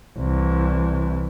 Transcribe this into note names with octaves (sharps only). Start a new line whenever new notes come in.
C2 E3